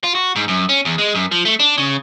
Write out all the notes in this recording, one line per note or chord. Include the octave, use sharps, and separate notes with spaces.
F4
F#4
G#2
F#2
C#4
E2
G#3
F#2
F3
A3
D4
C#3